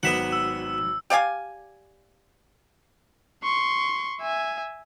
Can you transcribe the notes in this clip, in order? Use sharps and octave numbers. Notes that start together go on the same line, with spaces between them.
G#1 D#3 F#3 B3 E5 F#5
E6
G4 D5 F5 G#5
C6 C#6
E5 G#5